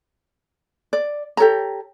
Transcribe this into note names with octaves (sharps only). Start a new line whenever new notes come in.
D5
G4 A4 C#5 A#5